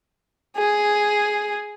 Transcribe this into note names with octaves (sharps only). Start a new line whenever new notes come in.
G#4